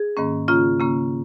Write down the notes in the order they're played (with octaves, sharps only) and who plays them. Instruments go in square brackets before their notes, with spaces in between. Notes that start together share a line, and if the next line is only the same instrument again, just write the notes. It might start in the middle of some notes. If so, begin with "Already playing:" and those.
Already playing: [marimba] G#4
G#2 D#3 A#3 C#4
C#3 A#3 C#4 F4
C#3 A#3 C#4